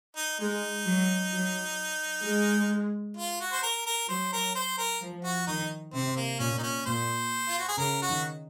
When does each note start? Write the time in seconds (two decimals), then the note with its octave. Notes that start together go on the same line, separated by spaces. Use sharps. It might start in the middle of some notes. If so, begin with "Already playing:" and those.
0.16 D#4
0.40 G#3 D#4
0.86 F#3
1.33 F#3
2.24 G#3
3.17 F4
3.40 F#4
3.52 C5
3.63 A#4
3.86 A#4
4.09 F#3 C5
4.33 A#4
4.55 C5
4.78 A#4
5.02 F3
5.24 F#4
5.48 D#3 D#4
5.94 C3 C4
6.17 A#3
6.39 A#2 C#4
6.58 D#4
6.63 C#4
6.86 A#2 C5
7.48 F4
7.58 F#4
7.68 G#4
7.78 C#3 A#4
8.02 F#4
8.09 D#3